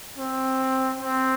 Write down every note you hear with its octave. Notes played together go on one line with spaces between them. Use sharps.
C4
C4